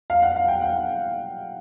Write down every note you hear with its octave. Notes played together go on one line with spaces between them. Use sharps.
F5
F#5
F5
G5
F#5